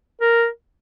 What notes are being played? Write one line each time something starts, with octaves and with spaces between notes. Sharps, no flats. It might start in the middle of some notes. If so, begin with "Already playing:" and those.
A#4